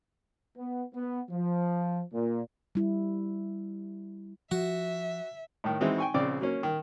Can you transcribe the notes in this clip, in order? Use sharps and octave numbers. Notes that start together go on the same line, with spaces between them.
B3
B3
F3
A#2
G3 E4
F3 F#4 E5
A2 D#3
E3 G#3 C4 D#4 F#4
G5 G#5 C#6
A#1 C#3 C4 D5 D6
F#3 A#3 C#4
D#3